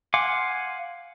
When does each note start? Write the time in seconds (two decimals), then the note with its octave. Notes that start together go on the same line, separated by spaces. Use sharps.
0.14 F5 F#5 G#5 C6 D6